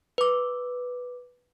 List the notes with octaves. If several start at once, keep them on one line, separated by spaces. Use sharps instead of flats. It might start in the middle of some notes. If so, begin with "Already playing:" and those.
B4 D6